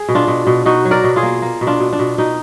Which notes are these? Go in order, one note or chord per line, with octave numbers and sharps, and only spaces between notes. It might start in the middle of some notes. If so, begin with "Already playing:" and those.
Already playing: G#4
B2
D4 F4
B2
B2
B2 D#4 F#4
F#3
A#4 D5
B2
F4 G#4
A#3
A#3
B2
D4 F4
B2
D4
B2
B2 D#4